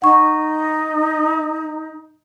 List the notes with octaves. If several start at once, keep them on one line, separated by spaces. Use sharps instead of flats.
D#4 F#5 C#6